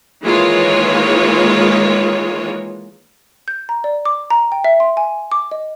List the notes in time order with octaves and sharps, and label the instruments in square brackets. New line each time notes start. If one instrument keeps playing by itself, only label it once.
[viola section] D#3 E3 G#3 A#3 F4 C#5
[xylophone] G6
A#5
D5
D6
A#5
G5
E5
C6
G#5
D6
D#5